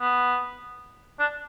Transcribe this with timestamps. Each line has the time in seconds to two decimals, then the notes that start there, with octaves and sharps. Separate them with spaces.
0.01 B3
1.20 D4